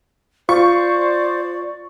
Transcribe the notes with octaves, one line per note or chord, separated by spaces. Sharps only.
F4 C5 D5 C#6